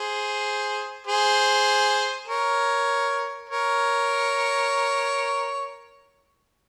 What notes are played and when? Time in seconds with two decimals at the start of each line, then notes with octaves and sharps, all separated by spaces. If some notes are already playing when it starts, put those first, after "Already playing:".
Already playing: G#4 C5
1.07 G#4 C5
2.28 A#4 C#5
3.49 A#4 C#5